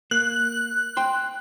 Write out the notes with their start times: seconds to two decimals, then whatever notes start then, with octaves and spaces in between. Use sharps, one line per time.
0.11 A#3 F#6
0.97 G5 C6